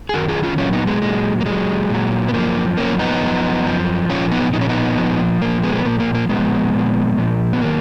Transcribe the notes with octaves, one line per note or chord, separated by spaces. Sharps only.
G#4
F#2 D#3 F#3 F#4 A#4
F4 G#4
C#4 F4
A#2 F#3 C#4 F4
B3 D#4
G#3 B3
A#2 F#3 G#3
A#3
A#2 F#3 G#3
A#2 F#3
B3
F#2 F3 A#3
F#2 F3 A#3 C#4
B3 D#4
F#2 F3
F#2 F3
A#2 F3 C#4 F4
B3 D#4
A#2 F3 D#4
C#4
B3 D#4
A#2 F3
A#2 F3 A#3
G#3 B3
B3
A#2 F3 A#3
A#3
A#3
A#2 F3 G#3 B3
A#2 F3
A#2 F3
B3
D#3 F#3 A#3